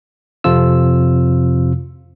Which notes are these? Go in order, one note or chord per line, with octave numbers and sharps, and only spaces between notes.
F2 C3 F3 F4 E6